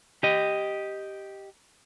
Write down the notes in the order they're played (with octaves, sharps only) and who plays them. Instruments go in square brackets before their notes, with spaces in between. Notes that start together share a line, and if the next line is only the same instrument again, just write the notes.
[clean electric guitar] G4 D#5